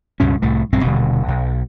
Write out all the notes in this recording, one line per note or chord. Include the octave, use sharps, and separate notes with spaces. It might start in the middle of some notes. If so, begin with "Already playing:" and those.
C#2 G2 B2 C#4
C2 A2 A3
A#1 G2 C4
D#1 B2 D3 G3
B1